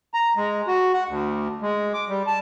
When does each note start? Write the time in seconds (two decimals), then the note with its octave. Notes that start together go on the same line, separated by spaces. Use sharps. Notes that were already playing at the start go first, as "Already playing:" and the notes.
0.14 A#5
0.37 G#3
0.67 F#4
0.93 F#5
1.08 D2
1.61 G#3
1.94 D6
2.08 G3
2.27 A5